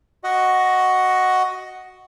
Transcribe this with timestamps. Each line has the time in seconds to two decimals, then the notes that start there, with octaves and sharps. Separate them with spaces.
0.24 F#4 D#5 F#5